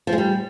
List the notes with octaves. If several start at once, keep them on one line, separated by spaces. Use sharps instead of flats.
F3
G#3
G3